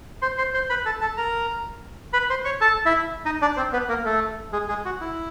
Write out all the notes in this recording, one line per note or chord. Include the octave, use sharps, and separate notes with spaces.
C5 C6
C5 C6
C5 C6
B4 B5
A4 A5
A4 A5
A#4 A#5
B4 B5
C5 C6
C#5 C#6
A4 A5
E4 E5
D#4 D#5
D4 D5
C4 C5
B3 B4
A#3 A#4
A3 A4
G#3 G#4
G#3 G#4
F#4
E4